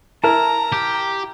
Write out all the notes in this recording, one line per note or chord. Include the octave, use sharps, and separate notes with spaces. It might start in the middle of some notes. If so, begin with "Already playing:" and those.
E4 A#4 A5 A#5
G4